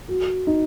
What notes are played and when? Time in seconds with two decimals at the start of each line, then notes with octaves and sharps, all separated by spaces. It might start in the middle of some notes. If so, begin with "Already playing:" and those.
0.08 F#4
0.47 D#4